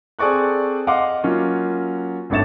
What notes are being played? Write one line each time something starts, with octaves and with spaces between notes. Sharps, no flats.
C4 G#4 A4 D5 C#6 F#6
D#5 F5 F#5 C6 D6
F#3 A#3 C#4 F4
G#1 G2 A3 C#5 A6 E7